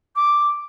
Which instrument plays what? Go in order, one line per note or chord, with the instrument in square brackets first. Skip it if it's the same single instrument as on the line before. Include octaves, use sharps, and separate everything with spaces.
[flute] D6